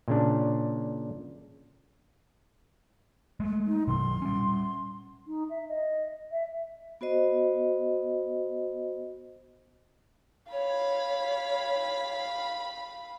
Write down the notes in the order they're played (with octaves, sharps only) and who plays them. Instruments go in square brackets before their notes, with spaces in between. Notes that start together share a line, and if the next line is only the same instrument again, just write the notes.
[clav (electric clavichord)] A#2 C#3 D4
[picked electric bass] G#3 A3
[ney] D#4
[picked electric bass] B2 D#3 F#3 [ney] C6
[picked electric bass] G3 C#4
[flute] D#4
E5
D#5
E5
[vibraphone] B3 F#4 C5 D#5
[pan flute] C#5 [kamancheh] F5 B5